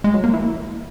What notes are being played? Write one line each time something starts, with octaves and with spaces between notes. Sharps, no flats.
G#3
F#3
A#3
E3